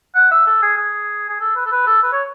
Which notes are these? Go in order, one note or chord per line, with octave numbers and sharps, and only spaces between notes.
F#5
E5
A4
G#4
G#4
G#4
A4
B4
A4
B4
A4
B4
C#5